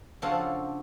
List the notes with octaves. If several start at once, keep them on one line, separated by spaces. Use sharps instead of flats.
C#3 F3 C4 D4 F#4 A4